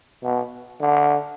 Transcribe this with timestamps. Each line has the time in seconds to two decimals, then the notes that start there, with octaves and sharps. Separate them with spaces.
0.23 B2
0.81 D3